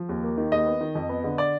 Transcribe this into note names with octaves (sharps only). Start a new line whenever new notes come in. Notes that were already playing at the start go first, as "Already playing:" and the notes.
Already playing: F3
D#2
A#3
D#3
D#2 D#5
B3
D#3
F2
B3
D3
D5